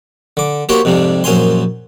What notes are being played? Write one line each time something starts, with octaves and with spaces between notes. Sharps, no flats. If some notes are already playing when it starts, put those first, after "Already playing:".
D3 D6
A#3 F#4 G4 C5 C#5 G5
F2 G#2 C3 G3 D4
A#1 F#2 C5 F5 G#5 C6